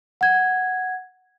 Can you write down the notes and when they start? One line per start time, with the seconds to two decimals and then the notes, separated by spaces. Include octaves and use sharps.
0.21 F#5 G#6